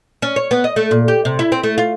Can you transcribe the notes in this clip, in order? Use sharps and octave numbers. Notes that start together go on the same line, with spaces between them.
C#4
C#5
B3
D#5
A3
A#2
G4
C3
E4
C4
A3
F4